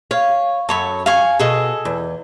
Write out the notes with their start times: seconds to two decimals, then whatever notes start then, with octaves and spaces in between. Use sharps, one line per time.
0.11 C#5 F5
0.69 F#2 A4 C#5 B5
1.06 F5 G#5 C#6
1.39 B2 G#4 A4 D#5
1.85 E2